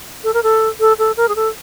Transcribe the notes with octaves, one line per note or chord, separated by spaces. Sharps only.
A4
A#4
A4
A4
A4
A#4
G#4
A4